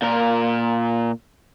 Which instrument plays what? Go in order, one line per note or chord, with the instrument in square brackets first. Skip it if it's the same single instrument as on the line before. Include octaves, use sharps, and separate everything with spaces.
[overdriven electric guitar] A#2 A#4